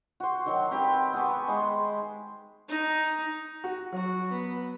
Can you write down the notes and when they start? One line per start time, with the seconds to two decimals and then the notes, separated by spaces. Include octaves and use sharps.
0.20 F#4 C5
0.46 D#3 F#3
0.71 C4 G4 B4
1.13 B3 G4 G#5 C#6
1.47 G#3 C5 G#5 B5
2.69 D#4
3.64 F#4
3.92 F#3 F#4
4.31 B3